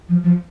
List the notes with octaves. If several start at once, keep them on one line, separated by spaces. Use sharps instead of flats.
F3
F3